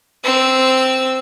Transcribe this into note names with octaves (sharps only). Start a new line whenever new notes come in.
C4 E6